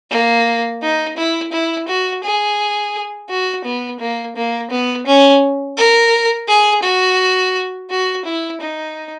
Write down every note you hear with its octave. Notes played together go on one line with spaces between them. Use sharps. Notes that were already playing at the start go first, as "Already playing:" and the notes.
A#3
D#4
E4
E4
F#4
G#4
F#4
B3
A#3
A#3
B3
C#4
A#4
G#4
F#4
F#4
E4
D#4